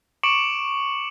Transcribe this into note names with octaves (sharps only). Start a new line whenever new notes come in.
C#6 D6 C#7 D7 E7 F#7